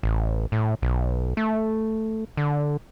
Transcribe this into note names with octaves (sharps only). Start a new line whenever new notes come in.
A1
A2
B1
A3
D3